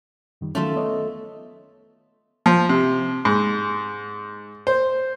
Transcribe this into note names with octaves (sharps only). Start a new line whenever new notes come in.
F#2 D#3 G3
D#3 F#3 A3 C#4 F4 E5
B3 C#5 D#5
F3
C3
G#2
C5